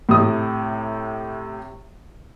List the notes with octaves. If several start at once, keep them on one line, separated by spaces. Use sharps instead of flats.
A2 C3 D#6